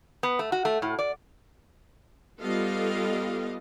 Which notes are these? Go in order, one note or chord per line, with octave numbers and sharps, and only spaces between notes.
B3
A3
F#4
A3
A2
D5
G3 B3 F4 A4 D#5 F5